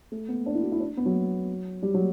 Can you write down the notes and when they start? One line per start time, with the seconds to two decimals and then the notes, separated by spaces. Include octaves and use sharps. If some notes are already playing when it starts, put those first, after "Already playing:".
0.12 A3
0.28 B3
0.46 D4
0.55 E4
0.63 F#4
0.72 E4
0.80 D4
0.97 B3
1.06 F#3
1.82 G3
1.94 F#3